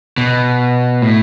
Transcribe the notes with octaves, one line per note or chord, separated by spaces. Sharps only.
B2
A2